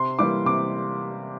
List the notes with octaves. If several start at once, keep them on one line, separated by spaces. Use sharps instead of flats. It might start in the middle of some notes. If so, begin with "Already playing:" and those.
Already playing: C3 C6
E3 G3 A#3 D6
C3 D6